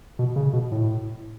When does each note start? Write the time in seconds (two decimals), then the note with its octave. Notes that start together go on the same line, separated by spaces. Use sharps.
0.19 B2
0.36 C#3
0.53 B2
0.72 A2